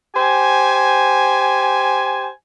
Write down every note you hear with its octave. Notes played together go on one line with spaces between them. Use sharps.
G4 C5 G#5